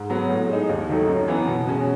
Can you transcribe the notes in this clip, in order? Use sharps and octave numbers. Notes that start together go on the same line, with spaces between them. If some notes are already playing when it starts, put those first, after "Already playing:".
Already playing: G#2
F#3 B3
A2
G#3 D#4
D#2
D#3 F#3 A3 D#4
F#2
E3 B3
B2
G#3 C#4 F#4